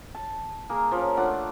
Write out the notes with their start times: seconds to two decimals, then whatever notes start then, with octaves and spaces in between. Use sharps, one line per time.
0.15 A5
0.70 A#3 G#4 A#4
0.92 F3 C#4
1.17 A3 D4 F4 F#5